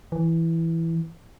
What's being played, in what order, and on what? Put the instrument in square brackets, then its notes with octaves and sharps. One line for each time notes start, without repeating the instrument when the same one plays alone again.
[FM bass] E3